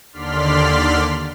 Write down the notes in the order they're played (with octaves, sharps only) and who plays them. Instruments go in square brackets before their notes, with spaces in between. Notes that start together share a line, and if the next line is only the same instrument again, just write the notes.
[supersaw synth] D#2 D3 D5 C6 F6 B6